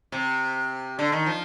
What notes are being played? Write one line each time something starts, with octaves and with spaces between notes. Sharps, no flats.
C3
D3
D#3
F3